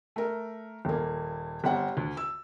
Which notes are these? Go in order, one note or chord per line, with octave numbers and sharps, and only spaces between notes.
A3 A#4
D#1 A#3
G1 G3 C4 F#5
D2
E6